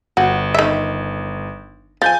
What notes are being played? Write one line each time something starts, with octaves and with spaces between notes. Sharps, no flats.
G1 F#4
D#3 E5
F3 G#5 G6 A6